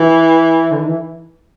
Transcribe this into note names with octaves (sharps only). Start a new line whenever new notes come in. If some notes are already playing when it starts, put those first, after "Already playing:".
Already playing: E3
D3
D#3
E3